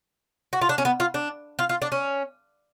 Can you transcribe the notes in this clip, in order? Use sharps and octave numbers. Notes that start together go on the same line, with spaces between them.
F#4
F4
D4
C#4
B3
F4
D4
F4
F4
D4
C#4